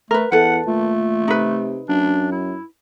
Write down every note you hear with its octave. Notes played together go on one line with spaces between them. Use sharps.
A3 A#4 B4
E2 A4 B4 F#5
A#2 A3
C3 D#4 B4
F#2 D4
E4